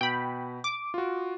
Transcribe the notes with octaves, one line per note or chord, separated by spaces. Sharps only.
B2 G5 B5
D6
F4 F#4